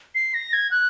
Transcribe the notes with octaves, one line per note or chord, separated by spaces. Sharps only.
C7
A#6
G#6
F#6